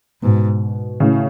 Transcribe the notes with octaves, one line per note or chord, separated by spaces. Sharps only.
G#2 B2
A2 C#3